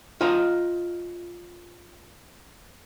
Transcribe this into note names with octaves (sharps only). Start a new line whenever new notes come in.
F4 C5 D#5 A#5